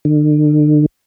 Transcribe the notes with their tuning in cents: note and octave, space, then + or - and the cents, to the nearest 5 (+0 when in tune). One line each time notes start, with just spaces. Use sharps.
D3 +40